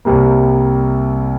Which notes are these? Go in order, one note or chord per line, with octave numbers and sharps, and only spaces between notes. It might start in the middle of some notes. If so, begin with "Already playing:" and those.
C2 C3 G3 A#3